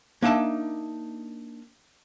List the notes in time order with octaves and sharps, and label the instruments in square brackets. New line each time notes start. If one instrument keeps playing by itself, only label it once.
[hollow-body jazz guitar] A#3 D4 D#4 E5 A5